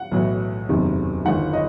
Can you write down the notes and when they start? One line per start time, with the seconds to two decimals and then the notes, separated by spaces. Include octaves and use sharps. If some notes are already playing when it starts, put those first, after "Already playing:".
Already playing: F#5
0.11 B1 A2 E3
0.69 F#1 E2 C3 D#3
1.25 G1 G2 D#3 F#5
1.53 D#5